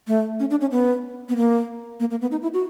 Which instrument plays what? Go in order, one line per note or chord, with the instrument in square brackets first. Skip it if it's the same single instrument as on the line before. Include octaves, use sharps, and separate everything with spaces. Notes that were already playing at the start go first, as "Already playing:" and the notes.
[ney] A3
C#4
D4
C#4
B3
B3
A#3
A#3
A#3
B3
D#4
E4
F#4